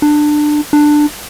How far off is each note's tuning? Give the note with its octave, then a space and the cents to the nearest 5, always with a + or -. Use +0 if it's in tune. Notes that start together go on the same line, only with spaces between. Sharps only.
D4 +20
D4 +15